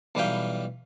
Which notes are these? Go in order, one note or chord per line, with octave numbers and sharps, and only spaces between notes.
B1 E3 G3 B4 F5 G5